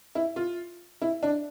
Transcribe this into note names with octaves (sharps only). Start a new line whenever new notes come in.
E4
F4
E4
D4